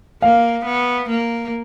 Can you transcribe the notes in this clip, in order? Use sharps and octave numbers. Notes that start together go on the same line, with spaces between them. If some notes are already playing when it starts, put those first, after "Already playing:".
A#3 F5
B3
A#3